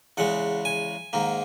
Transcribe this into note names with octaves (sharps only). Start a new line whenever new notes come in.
E2 C#3 G#3 F#5
G#5
G#2 D#3 A#3